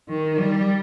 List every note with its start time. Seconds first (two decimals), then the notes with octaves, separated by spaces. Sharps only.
0.09 D#3
0.38 G3